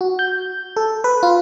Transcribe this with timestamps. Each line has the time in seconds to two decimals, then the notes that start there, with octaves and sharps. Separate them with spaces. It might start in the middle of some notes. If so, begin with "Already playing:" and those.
0.01 F#4
0.19 G6
0.76 A4
1.04 B4
1.23 F4